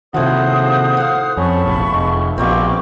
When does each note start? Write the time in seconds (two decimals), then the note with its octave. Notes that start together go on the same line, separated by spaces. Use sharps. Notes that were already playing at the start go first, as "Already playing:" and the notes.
0.14 A2 C3 D#3 F3 F#4 C5 D#6
0.97 F5 F#5
1.37 F2 C#4 A5 B5 C#6
1.65 F1 A#1
1.92 F1 G#3
2.38 A#1 G2 B2 A#3 C4 C#6 D6